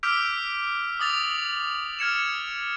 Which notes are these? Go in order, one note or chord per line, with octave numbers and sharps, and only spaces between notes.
D6 E6 F6 G6 B6 D7
D6 D#6 A6 F7
F6 G#6 C#7 E7